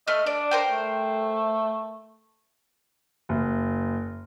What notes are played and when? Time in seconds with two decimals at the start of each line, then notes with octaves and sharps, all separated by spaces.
0.08 A3 D#5 F6
0.26 D4 D5
0.51 A#4 C5 G5
0.71 A3
3.29 F#1